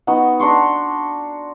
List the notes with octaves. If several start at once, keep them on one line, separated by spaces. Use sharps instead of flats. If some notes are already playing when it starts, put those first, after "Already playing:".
B3 D#4 F#4
D4 A#5 C6 C#6